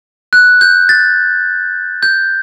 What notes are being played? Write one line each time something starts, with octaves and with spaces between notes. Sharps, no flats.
F#6
G6
A6
G6